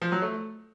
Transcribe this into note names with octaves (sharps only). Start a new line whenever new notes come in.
F3
F#3
A3